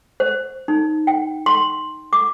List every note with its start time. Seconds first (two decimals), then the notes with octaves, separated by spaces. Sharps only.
0.20 C5
0.68 D#4
1.07 G5
1.46 C6
2.13 D6